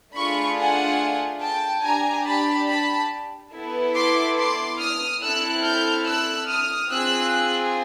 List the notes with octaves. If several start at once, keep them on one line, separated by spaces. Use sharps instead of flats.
A3 D4 F4 G#4 B5 C#6
F#5 G#5
G5 A5
D4 G4 G#5 A#5
A5 B5
A5 B5
B3 E4 A4
C6 D6
C6 D6
D#6 F6
C4 E4 A4 E6 F#6
F6 G6
E6 F#6
D#6 F6
C4 F4 G#4 E6 F#6